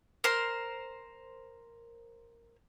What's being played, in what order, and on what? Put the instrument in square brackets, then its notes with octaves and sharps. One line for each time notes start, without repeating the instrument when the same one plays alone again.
[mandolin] A#4 C5 C6